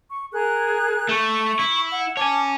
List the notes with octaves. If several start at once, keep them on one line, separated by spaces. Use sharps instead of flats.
C#6
G#4 A#4 F#6
A3 C#6
E4
F#5
C#5 G#5 A5 D6